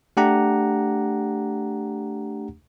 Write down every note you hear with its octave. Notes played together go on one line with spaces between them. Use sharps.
A3 D4 G4 F#5 A#5